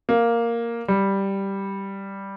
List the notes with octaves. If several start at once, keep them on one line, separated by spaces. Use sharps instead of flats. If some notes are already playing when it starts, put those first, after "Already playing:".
A#3
G3